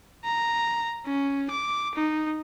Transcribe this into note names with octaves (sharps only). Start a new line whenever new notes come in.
A#5
C#4
D6
D#4